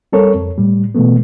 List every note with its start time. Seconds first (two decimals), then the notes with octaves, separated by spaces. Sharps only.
0.13 G3 C4 A4 A#4 C#5
0.35 F2
0.58 A2 G3
0.95 B2 E3 G#3 A3 B3